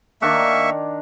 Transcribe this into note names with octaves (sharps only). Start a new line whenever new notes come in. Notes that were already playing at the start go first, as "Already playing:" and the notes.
D#3 A#3 D4 A#4 E5 C#6